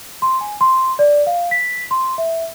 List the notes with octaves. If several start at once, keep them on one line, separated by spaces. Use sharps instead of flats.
C6
G#5
C6
D5
F5
B6
C6
E5